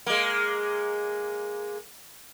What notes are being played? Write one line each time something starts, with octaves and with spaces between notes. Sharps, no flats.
G#3 A#3